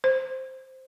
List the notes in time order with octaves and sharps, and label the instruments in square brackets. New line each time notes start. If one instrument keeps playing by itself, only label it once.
[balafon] C5